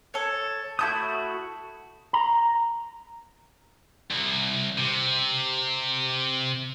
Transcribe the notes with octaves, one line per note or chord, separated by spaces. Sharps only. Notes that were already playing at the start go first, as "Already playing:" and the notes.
A4 C#5
A3 E4 F#4 A5 D#6 G6
A#5
C2
C3